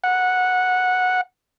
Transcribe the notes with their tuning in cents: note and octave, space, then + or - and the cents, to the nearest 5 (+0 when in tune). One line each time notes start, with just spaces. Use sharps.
F#5 -10